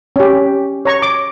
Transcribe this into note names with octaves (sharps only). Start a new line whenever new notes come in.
C#4 G4
C#5 A#5 C#6
D6